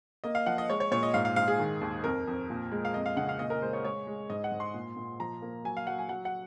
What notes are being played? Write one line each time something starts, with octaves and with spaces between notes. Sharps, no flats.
A#3 D#5
F5
F3 F#5
D#5
G#3 C#5
C#5
A#2 C#5
D#5
G#2 F5
F5
G#2 F5
G#4
D#3
D#2
F2 A#4
F2
A#2
G#3
F5
F2 D#5
F5
C#3 F#5
F5
A#2 D#5
A#4
G#3 C5
C#5
G#3 C#5
G#3
G#2 D#5
F#5
G#2
C6
A#2
A#2
F3 A#5
A#3
F#3 G#5
F5
F#3 F#5
G#5
F#3 F#5
F#5